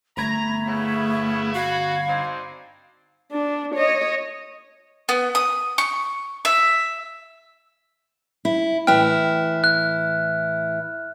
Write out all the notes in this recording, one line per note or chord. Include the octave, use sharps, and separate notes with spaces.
G1 A3 A#5 B5 G#6
C#3 B3 E4
F#4 F5
C4 D4 D#4
D4
C#5 D#5
B3
D#6
C#6
E5
E4
A2 E3 E4 G5 F6 F#6
F#6